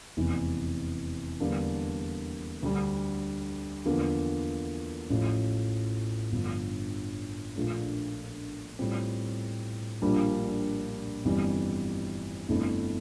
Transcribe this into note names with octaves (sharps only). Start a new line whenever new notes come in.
F1 E2 E3
E2 D3 G3 A#3 D4
D2 D3 G3
E2 D3 F3 A#3
A1 A2 F3
G1 G2 D3 F3
A#1 A#2 A3 D4 F4
A2 G3 C4 F4
A#1 A#2 G3 A#3 D4
G1 F2 E3 G3
G1 F2 D3 A3 E4